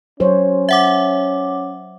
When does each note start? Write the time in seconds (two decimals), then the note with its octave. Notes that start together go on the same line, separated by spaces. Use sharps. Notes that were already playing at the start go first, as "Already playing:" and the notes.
0.20 F#3 C#4 C5 C#5
0.69 E5 F#5 D6